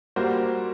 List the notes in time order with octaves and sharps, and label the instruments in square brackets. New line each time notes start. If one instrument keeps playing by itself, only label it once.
[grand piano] G3 A#3 F#4 C5